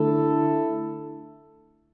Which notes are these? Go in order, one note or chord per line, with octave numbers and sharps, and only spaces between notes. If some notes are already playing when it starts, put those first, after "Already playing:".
Already playing: D3 A3 E4 A4